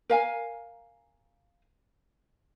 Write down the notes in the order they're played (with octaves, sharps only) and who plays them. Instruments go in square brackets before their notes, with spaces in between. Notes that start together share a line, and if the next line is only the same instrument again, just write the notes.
[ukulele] A#4 F5 G#5